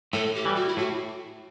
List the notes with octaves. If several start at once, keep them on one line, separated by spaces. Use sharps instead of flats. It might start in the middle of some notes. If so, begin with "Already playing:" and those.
A2 A4
G4
E3 G3
F#4
E4
A2 F#4